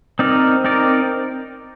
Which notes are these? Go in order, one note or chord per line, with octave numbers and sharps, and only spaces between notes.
C4 D#4 A#4 D5
C4 D#4 A#4 D5